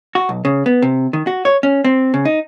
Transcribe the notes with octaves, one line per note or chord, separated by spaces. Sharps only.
F#4
B1
C#3
B3
C3
D#3
F#4
C#5
C#4
C4
C#3
D#4